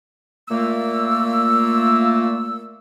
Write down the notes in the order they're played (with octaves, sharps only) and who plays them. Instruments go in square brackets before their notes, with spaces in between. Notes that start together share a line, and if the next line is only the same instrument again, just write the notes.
[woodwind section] A#2 A3 A#3 E6